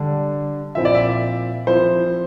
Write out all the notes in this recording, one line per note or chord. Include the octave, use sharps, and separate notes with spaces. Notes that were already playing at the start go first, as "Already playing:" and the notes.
Already playing: D3 G3 D4
A#2 F3 C4 E4 E5
D5
E5
F3 C4 E4 C5